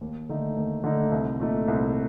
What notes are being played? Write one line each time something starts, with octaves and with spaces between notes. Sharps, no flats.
D#2
D3 A3 D#4
D#2
D3 A3 D#4
C2
A#2 A3 D#4
C2